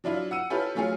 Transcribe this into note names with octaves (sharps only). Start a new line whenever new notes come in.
F#3 D4 E4 F4
F#5 E6 D#7
C#4 E4 F4 G4 A4 B4
F#3 A3 C#4 F4 G#4